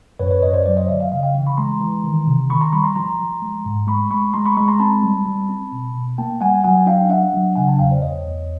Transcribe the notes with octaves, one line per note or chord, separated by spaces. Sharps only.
F#2 B4 C#5
B4 C#5
F#2 C#5 D#5
C5 D5
F#3 C5 D5
C#5 D#5
D3 D5 E5
D#5 F5
C#3 D#5 F5
F5 G5
E3
B5 C#6
G#3 A#5 C6
E3
D#3
C3
D#3 B5 C#6
A#5 C6
G3 B5 C#6
A#5 C6
F3 A#5 C6
F3
G#3
G#2
G#3 B5 C#6
G#3 B5 C#6
G#3 A#5 C6
B5 C#6
G#3 B5 C#6
A#5 C6
C4 A5 B5
G3
G3
C4
B2
B2
A#3 G5 A5
G3 F#5 G#5
F#3 F#5 G#5
D4 F5 G5
D4 E5 F#5
F#3
C#3 F#5 G#5
G5 A5
E2 F5 G5
C5 D5
E2 C#5 D#5
E2